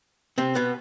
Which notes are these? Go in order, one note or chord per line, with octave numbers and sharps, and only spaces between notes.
C3 C4
B2 B3